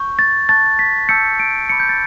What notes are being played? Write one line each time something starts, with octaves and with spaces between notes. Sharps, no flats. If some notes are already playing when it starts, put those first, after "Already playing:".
Already playing: C#6 G6
A6
A5 C#6 F#6 A6
B6
A5 E6 G6 C#7
D7
B5 D6 G6 C#7
G6
A6